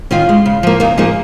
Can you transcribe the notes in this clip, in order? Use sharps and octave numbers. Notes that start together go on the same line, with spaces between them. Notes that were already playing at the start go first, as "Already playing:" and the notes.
D#3 C#4 F4
G#3
C#3
F3 A#3
C#3 A#3 D#4
F3 A#3 D#4 G#4